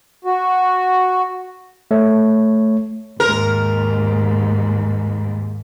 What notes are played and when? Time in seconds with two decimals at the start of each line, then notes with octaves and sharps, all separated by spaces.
0.25 F#4
1.91 A3 C#5
3.20 D#2 G#2 A#4